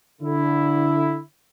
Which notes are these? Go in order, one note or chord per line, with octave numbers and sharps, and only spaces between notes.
D3 E4